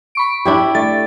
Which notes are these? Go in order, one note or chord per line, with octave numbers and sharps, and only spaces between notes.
B5 C#6 D7
D4 E4 G4
A3 D5 A6